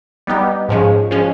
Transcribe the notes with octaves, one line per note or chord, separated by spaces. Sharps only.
G3 B3 D#4 G4
G#2 F3 G#3 C#4
F3 G#3 C#4